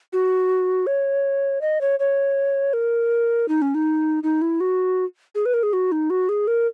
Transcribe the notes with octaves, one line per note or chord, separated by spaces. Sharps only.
F#4
C#5
D#5
C#5
C#5
A#4
D#4
C#4
D#4
D#4
E4
F#4
G#4
B4
A#4
G#4
F#4
D#4
F#4
G#4
A#4